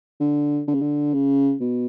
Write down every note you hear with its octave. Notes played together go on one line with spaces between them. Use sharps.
D3
D3
C#3
D3
C#3
B2